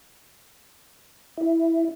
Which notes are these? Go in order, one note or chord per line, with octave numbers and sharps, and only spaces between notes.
E4